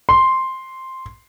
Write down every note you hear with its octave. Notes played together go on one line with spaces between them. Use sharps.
C6